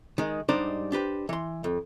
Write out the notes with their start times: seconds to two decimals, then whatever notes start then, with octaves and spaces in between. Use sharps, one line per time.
0.18 D#3 G#3
0.49 G#2 G3 D4 D#4 C5 D5
0.92 D4 G4 B4 C5
1.29 E3 C6
1.64 F2